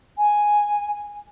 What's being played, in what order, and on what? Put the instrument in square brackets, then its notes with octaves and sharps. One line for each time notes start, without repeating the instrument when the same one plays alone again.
[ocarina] G#5